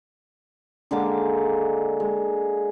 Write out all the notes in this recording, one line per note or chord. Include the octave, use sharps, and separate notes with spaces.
D3 G#3 A#3 D6
G#3